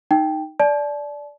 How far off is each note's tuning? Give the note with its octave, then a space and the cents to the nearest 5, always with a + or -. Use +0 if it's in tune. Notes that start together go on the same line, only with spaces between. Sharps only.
D#4 +0 G5 +0
D5 -10 A5 -35